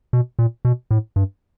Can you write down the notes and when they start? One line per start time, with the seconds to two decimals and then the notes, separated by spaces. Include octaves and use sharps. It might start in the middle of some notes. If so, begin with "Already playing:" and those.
0.13 B2
0.39 A#2
0.65 B2
0.91 A2
1.16 G2